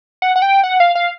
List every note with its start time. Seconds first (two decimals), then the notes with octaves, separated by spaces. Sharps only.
0.22 F#5
0.36 F#5
0.42 G5
0.64 F#5
0.80 F5
0.95 F5